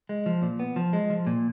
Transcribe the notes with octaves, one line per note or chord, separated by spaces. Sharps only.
G#3
F3
A#2
B3
F3
G#3
F3
A#2